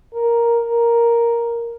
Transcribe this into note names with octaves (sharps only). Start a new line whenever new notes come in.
A#4
A#4